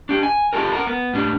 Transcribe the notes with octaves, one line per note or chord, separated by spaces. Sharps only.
D4 G4
G#5
E4 F4 G4 A4 A#4
A#4 F#5 A#5
B3
A2 G3 D4